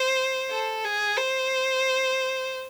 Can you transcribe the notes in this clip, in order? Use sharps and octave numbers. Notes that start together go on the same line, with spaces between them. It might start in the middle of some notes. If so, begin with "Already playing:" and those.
Already playing: C5
A4
G#4
C5